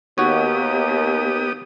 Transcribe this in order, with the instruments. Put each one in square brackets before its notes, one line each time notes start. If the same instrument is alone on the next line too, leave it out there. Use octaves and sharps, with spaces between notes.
[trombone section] D#2 [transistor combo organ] B3 G4 D#6 [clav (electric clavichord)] F#4 C#5